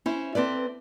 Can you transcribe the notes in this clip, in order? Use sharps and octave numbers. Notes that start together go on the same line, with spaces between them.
C#4 E4 C5
C4 A4 B4 D5